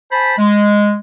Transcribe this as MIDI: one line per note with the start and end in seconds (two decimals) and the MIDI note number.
0.12 0.33 72
0.12 0.33 80
0.12 0.33 81
0.12 0.33 83
0.38 0.95 56